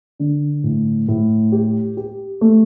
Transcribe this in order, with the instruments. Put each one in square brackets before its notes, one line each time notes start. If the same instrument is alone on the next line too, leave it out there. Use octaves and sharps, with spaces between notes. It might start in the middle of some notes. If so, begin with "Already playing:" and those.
[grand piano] D3
A2
A2
G4
G4
A3